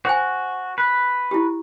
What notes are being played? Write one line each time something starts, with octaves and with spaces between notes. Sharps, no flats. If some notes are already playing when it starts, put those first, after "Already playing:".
F#4 C5 G#5
B4
E4 G4